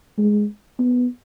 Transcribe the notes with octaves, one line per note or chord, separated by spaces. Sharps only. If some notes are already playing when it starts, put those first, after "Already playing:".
G#3
B3